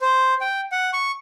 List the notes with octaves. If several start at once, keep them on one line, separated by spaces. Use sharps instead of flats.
C5
G5
F#5
C#6